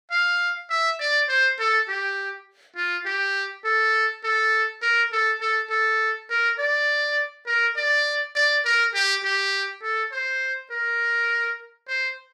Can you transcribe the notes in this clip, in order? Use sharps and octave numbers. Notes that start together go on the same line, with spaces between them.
F5
E5
D5
C5
A4
G4
F4
G4
A4
A4
A#4
A4
A4
A4
A#4
D5
A#4
D5
D5
A#4
G4
G4
A4
C5
A#4
C5